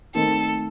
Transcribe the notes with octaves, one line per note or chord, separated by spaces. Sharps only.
D#3 A3 C4 D#4 A4 A#4